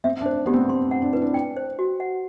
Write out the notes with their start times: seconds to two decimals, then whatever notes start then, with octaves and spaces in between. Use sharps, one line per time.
0.04 C4 E5
0.21 D4
0.26 C5
0.46 B3 G4
0.54 C4
0.69 C4 C6
0.91 F#5
1.02 D4
1.13 E4 B4
1.22 D4
1.34 G5
1.57 C5
1.79 F#4
2.00 F#5